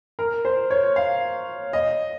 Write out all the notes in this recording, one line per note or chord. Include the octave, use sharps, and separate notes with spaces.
A#4
C5
C#5
F5
D#5